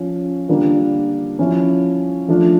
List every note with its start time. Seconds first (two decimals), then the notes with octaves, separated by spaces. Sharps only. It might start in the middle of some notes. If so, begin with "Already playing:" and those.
Already playing: F3 C#4 F4
0.48 D3 G3 A#3 D4 F4
1.39 F3 C#4 E4
2.28 F3 A3 D4 F4